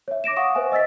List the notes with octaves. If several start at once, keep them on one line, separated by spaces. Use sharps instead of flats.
C#5 E5
D6 A#6 D7 E7
F5 F#5 C#6 D#6
B4 C5 E5 G#5
D#5 E6 A6 B6